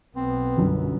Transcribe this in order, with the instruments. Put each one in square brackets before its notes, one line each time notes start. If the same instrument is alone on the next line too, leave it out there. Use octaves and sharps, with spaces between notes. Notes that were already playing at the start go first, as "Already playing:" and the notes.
[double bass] B1 B3 [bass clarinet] C4
[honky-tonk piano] G1 F#2